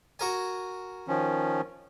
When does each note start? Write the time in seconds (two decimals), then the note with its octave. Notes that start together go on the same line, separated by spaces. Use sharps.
0.19 F#4 A#4 G#5
1.08 D#3 F3 C#4